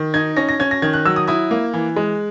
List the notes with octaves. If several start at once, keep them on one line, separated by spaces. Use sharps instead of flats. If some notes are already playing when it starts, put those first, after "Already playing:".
Already playing: D#3
D#4 G#6
C#4 A#6
A#6
C#4 G#6
A#6
D#3 G#6
F#6
F#3 E6
D#6
E4 D#6
A#3
E3
G#3